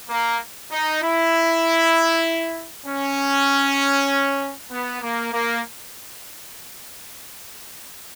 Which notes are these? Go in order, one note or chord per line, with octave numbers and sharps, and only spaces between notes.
A#3
D#4
E4
C#4
B3
A#3
A#3